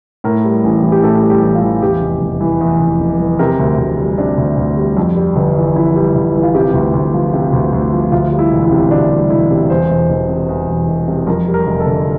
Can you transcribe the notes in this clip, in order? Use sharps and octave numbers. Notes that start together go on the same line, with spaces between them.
A2 A#4
G3
A1
E3
G4
A2 A4
G3
G4
A1
F4
E3
E2 G4
F1
F1
E3
E2
F1
F1
E3
C3 A#4
D2
D2
G3
C3 D4
D2
D2
G3
F2
G3
G1
E3
F2 E4
G3
G1
E3
F4
C3 G4
D2
D2
F3
C3
D2
D2
F3
D2 F4
G3
E4
E1
E4
C3
D2 D4
G3
E1 E4
C3
E2 C5
E1
E1
C3
E2
E1
E1
C3
F2 A#4
G3
A#4
F1
A4
D3